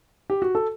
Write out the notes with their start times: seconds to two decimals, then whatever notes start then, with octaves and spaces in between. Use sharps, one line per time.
0.30 G4
0.42 F#4
0.55 A4